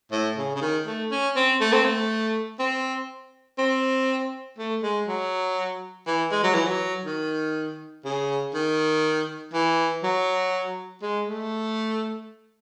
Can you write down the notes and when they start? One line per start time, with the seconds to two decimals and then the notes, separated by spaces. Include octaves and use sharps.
0.12 A2
0.37 C#3
0.56 C#3
0.62 D#3
0.87 A3
1.11 C#4
1.36 C4
1.61 A3
1.73 C4
1.85 A3
2.59 C4
3.59 C4
4.58 A3
4.83 G#3
5.08 F#3
6.07 E3
6.31 G#3
6.44 F#3
6.55 E3
6.67 F#3
7.06 D#3
8.05 C#3
8.55 D#3
9.54 E3
10.03 F#3
11.03 G#3
11.27 A3